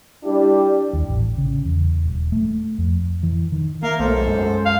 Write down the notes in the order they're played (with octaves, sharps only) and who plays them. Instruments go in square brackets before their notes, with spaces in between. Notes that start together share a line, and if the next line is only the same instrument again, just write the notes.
[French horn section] G3 D4 E4 G4
[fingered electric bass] D#2
A1
C#3
E2
D#1
A3
F2
E3
D#3
[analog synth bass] A#3 [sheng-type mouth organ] A#4 F5 [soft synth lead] E5
[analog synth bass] B1 [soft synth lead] A3 [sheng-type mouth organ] A4 C5
[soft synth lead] G#3
[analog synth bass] F#2
[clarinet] F5